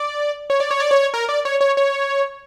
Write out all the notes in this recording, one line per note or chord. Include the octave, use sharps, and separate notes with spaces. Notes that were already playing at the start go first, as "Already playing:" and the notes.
Already playing: D5
C#5
D5
C#5
D5
C#5
A#4
D5
C#5
C#5
C#5